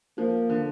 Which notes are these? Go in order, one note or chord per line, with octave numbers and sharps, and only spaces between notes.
F3 A#3
D3